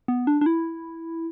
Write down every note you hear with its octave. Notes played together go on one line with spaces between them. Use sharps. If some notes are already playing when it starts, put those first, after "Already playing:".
B3
D4
D4
E4